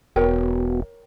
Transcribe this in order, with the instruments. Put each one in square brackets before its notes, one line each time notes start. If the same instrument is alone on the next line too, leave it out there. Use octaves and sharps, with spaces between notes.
[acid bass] E1 [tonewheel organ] B3 F#4 [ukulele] A#4 C#5 G5